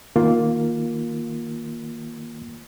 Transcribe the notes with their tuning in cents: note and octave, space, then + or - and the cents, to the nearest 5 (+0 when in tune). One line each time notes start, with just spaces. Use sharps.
D#3 +15 A#3 +0 F4 +10